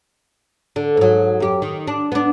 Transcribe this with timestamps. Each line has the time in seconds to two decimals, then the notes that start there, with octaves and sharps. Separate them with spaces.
0.76 D3
0.97 G#2 F#3
1.40 F#2 G4
1.62 D#3
1.87 D4
2.12 B3 D4